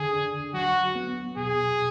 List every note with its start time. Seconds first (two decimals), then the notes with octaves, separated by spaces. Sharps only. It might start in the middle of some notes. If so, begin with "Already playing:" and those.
Already playing: D3 G#4
0.13 D4
0.54 F#3 F#4
0.95 B3
1.37 B2 G#4